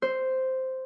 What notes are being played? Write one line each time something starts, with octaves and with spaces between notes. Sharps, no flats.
C5